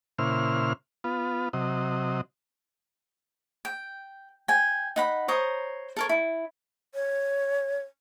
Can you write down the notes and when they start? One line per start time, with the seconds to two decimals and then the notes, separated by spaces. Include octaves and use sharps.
0.19 A#2 C#3 E4 C5 F6
1.04 B3 F4
1.53 C3 F#3 D#5
3.65 G5
4.48 G5 G#5
4.96 D#4 F#5 B5
5.28 C5 C#5 A#5 D#6
5.97 A4 A#4 C#5
6.09 E4
6.95 C#5